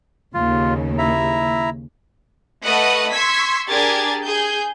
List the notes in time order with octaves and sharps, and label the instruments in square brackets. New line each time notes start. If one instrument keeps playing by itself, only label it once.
[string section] D#2 C#3 [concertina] F4
[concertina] E4 E5 A#5
[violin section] A3 B4 D#5 F#5 D#6
C6 C#6 E6 G#6 B6
D4 G4 G#4 A#4 G#6 A6
G#4 G6